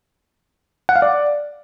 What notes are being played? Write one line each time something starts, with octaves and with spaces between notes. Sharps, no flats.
F#5
F5
D5